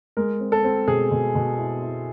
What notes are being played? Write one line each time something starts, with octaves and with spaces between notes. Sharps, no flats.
G#3 A#4
C4
A4
C4
B2 G#4
B2
B2
E4
E4